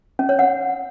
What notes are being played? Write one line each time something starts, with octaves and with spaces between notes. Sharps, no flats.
C#4
C#5
F#5